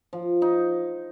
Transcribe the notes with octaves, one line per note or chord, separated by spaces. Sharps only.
F3
D#4